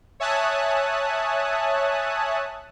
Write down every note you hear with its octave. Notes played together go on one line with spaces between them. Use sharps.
C#5 E5 G#5 A5 D#6 F#6